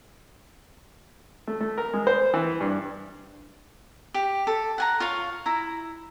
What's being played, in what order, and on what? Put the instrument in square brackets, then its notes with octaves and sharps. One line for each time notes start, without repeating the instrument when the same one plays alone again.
[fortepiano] A3
A3
A#4
G#3
C5
E3
G2
[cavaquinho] G4
A4
F#5 G#5 A#5
F4 C#5 F5
E4 A#5